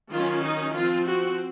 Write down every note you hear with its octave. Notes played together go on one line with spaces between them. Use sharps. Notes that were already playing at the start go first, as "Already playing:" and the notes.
D#3 F#3 C#4 F4
D#4
F3 C4 F4
F#4